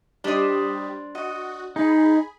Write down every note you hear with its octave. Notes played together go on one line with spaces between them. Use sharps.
G3 D4 G4 C5 D#5
F#4 D#5
D#4 G#4 B5